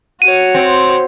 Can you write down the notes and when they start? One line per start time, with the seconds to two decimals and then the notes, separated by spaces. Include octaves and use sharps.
0.22 F#4 C#5 D#7
0.55 C4